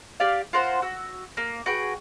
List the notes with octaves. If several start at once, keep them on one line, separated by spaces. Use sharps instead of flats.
G4 D5 F5
F4 A#4 C5 F#5
F#4 E6
A#3
F#4 G#4 B4 G5